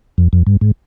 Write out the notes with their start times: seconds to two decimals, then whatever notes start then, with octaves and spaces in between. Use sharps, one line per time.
0.18 F2
0.33 F2
0.47 G2
0.61 G#2